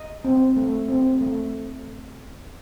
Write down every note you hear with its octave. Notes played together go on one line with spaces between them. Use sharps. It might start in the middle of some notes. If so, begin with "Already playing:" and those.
Already playing: D#5
C4
A3
C4
A3